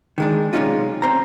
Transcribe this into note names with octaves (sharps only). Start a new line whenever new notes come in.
D#3 G#3 D4
B1 C3 G#3 C#4 D#4 F4
C4 C5 A#5